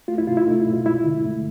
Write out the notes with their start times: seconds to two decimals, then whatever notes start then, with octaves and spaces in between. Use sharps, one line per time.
0.08 A3 F4
0.18 E4
0.27 C3 F4
0.37 E4
0.47 A3 D#4
0.60 E4
0.66 B2
0.73 F4
0.85 G#3 E4
1.05 D3
1.24 A3